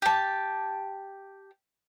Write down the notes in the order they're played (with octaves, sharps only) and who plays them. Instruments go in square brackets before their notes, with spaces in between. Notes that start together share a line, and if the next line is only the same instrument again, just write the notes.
[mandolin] G4 A5